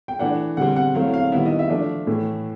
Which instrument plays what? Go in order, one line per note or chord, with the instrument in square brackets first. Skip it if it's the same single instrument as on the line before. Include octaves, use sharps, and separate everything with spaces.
[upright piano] G5
E3 A3 D4 F#5
D3 G3 C4 F#5
F#5
F#3 A3 C4 E4 F5
F5
D#3 G3 B3 E4 E5
D#5
E5
F3 A3 D4
A2 E3 A3